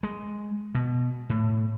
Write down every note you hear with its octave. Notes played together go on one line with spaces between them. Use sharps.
G#3
B2
A2